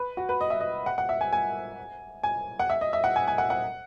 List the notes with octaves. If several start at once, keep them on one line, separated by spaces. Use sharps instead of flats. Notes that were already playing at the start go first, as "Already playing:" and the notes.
Already playing: B4
F#4
B4
D#5
E5
D#5
F#5
F#5
E5
G#5
G#5
G#5
F#5
E5
D#5
E5
F#5
G#5
G#5
F#5
F#5